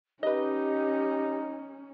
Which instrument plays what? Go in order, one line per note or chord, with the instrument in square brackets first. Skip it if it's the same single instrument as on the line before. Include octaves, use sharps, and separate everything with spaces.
[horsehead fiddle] C#4 [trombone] D#4 [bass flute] G4 [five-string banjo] B4 D#5